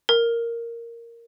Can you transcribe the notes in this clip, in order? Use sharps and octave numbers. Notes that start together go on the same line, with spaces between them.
A#4